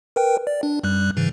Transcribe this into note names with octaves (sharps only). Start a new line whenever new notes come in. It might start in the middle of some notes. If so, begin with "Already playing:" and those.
A#4 B4 G5
D5
D4
F#2 G3 F#6
G#2 C#3 E3